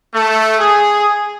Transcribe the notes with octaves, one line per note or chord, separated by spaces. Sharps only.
A3
G#4